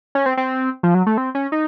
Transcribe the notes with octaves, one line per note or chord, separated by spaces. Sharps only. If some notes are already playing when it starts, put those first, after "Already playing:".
C#4
C4
C4
F3
F#3
A3
C4
C#4
D#4